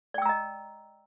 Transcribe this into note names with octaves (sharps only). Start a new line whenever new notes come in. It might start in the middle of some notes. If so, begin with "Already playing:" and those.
D5 D#5 G5 A#5 E6